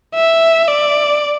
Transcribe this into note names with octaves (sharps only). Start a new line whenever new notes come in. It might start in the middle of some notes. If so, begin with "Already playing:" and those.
E5
D5